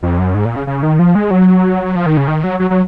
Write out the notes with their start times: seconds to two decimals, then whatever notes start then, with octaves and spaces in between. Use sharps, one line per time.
0.03 F2
0.19 F#2
0.34 G#2
0.45 A#2
0.56 C#3
0.67 C#3
0.83 D#3
0.99 F3
1.15 G#3
1.31 F#3
1.95 F3
2.06 D#3
2.17 C#3
2.28 D#3
2.44 F#3
2.59 F#3
2.70 F#3